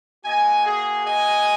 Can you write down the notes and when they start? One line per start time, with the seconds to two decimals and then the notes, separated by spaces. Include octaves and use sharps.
0.25 A#3 F#4 D#5 G#5
0.66 G#4
1.06 D#5 G#5